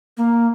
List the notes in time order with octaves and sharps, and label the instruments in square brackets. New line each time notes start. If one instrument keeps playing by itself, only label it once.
[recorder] A#3